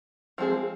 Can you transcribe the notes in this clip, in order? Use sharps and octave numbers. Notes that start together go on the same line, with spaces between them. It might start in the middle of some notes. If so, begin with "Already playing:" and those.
F3 G#3 C4 G#4